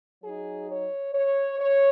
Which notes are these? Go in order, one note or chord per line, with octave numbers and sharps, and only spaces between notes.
F#3 D#4 G#4
C#5
C#5
C#5